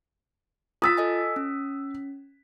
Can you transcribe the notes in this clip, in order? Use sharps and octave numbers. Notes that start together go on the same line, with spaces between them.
F4 D#6 E6 A6 B6
A4 D#5 G#5
C#4